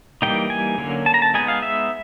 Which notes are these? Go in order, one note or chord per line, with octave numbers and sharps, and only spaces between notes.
E3 G3 A#3 D#4 G5
G#5
D3 F#3 A#3 C#4
A5
A#5
A5
G#3 B3 D#4 G#5
F5
E5